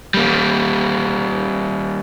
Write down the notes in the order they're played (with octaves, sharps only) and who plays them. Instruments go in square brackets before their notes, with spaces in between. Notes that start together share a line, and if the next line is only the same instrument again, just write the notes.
[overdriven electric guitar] G3 A#3